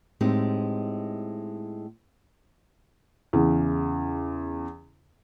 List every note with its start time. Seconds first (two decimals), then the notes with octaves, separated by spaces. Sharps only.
0.21 A2 G#3 C4 D#4 G4
3.33 E2 C#3